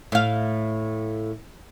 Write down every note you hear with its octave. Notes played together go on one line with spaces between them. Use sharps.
A2 F5